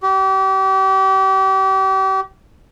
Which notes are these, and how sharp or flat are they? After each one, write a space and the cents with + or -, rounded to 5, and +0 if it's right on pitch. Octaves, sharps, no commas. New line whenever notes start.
G4 -35